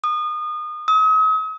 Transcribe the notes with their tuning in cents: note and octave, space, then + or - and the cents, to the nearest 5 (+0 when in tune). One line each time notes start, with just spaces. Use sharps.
D#6 -30
D#6 +45